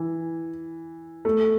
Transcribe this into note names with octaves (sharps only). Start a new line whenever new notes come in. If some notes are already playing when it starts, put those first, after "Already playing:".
Already playing: E3
A3